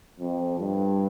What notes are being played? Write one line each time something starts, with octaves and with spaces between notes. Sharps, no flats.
F2
G2